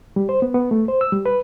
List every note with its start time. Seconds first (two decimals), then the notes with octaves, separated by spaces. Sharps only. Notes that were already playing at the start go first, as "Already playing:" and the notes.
0.16 G3
0.29 C5
0.42 B3
0.54 B3
0.71 A3
0.88 C5
1.01 E6
1.12 G3
1.26 B4